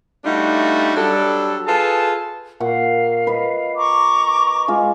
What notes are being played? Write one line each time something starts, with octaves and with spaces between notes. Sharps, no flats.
G3 A3 D4 D#4 F4 F#4
F#3 G3 D4 A4
F4 G#4 A4 B4 A5
A#2 F5 F#5 C#6
B4 D#5
A#5 C#6 D6
G#3 F4 D#5